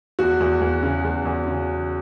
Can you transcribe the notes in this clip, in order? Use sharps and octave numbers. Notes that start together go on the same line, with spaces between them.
E2 F#4
E2
E2
C#3
E2
E2
C#3